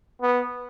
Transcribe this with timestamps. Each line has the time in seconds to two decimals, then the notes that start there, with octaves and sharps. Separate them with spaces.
0.22 B3